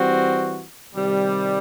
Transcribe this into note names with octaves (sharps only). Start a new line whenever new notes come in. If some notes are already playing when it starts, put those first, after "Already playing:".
Already playing: E3 G3 C4 F#4
C3 D#3 G3